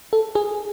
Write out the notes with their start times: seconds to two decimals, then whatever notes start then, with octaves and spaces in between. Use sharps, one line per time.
0.13 A4
0.35 G#4